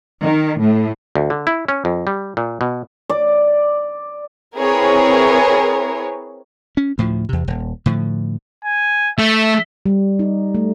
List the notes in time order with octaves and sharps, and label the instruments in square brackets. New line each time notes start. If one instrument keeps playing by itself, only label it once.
[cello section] D#3
A2
[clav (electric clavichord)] D2
D3
E4
C#4
F2
G3
A#2
B2
[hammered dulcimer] D5
[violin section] C4 E4 G#4 A#4 B4 C#5
[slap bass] C#4
D2 A2 F3
E2 C3
D#1
A2 D3 F3
[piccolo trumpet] G#5
[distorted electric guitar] A3 [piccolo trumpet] E5
[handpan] G3
D#4
A3